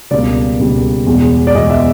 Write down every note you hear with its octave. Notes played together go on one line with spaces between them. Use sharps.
C#2 B2 G3 A#3 D5
C#2 B2 G3 A#3
E2 B2 G#3
D5
E2 B2 G#3 D#5
E5